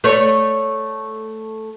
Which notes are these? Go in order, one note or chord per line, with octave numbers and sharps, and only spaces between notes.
A3 C#5